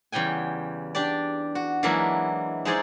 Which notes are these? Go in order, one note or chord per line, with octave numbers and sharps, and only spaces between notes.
E2 C#3 G3 G5 G#5
D4 G4 D5
F#4
E3 F#3 G#3 A#3 D4 E4
G#3 D#4 E4 G#4 C5 D5